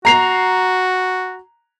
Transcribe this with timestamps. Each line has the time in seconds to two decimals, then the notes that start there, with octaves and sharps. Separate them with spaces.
0.05 F#4 A#5 C7 F7